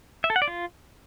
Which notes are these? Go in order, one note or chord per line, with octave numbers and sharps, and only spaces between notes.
E5
A4
F#5
D5
F4